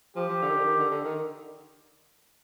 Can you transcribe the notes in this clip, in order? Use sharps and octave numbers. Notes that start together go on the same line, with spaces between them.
F3 G4
F3
D3
D#3
D3
D#3
D3
D3
D#3